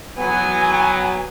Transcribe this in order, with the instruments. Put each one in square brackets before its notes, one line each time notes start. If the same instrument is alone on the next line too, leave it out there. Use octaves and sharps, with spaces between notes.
[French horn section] F#3 B3 [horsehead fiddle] G#5